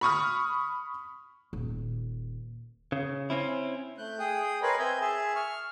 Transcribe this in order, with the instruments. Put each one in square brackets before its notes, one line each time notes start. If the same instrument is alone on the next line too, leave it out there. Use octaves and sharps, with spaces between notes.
[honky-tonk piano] B5 C#6 D#6 F6
[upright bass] D#1
[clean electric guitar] C#3
C4 C#4 E4
[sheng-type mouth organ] A3 F#6 G6
G#4 G5 D#6
A#4 B4 C#5 D#5 B5 C6
C4 E5 G#5 G6
G#4 E5 G#5 A5
C#6 F6